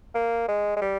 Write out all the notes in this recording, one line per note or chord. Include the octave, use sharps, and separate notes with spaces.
A#3
G#3
G#3
G3